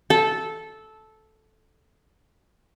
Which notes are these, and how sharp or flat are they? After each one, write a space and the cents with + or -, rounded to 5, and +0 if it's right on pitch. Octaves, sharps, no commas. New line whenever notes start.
A4 -10